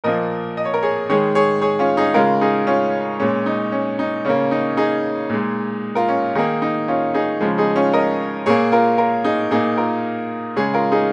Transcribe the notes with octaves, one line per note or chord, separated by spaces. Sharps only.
A#2 F3 A#3 A#4 D#5
D#5
C#5
A#4
G#4 C#5
D#3 G#3 G#4 C#5
G#4 C#5
G#4 C#5
C#4 F4
D#4 G#4
C#3 G#3 F4 A#4
D#4 G#4
C#4 F4
A#2 G#3 C#4
D#4
C#4
D#4
C#3 A#3 C#4
D#4
D#4 G#4
A#2 G#3
F4 A#4
C#4
D#3 A#3 D#4 G#4
D#4
C#4 F4
D#4 G#4
C#3 F3 G#3
D#4 G#4
C#4 F4
A#4 D#5
A#2 A#3 G#4 C#5
F4 A#4
F4 A#4
D#4 G#4
A#2 A#3 D#4 G#4
F4 A#4
C#3 G#3 G#4 C#5
F4 A#4
D#4 G#4